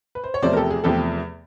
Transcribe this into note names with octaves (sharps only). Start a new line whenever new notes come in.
B4
C5
C#5
E2 C3 F3 A3 C5 D5
A#4
G4 A4
G#4
E2 C3 F3 A3 G4 A4